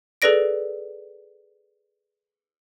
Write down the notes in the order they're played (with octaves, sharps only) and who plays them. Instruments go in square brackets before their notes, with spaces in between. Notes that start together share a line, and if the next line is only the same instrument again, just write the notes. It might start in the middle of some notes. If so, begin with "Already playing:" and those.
[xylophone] G#4 A4 B4 D5 A#6 D7